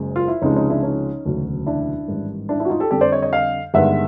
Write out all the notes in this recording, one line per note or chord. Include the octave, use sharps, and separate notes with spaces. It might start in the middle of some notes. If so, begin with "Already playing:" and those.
Already playing: F#1 F#2 G#3
F4
E4
C#2 C3 F3 G#3 C#4 D#4
C#4 D#4
D4 E4
C#4 D#4
E1 D2 C#3 F#3
D4 E4
A1 G#2 D#3 G3
D4 E4
D4 E4
F#4
D#4 F4
G4 A4
F2 D3 G3 G4 A4
C5 D5
C#5 D#5
C#5 D#5
D#5 F5
G1 G2 D#3 G#3 E5 F#5